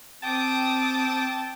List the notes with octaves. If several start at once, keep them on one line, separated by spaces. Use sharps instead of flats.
C4 G5 A5 D6 D#6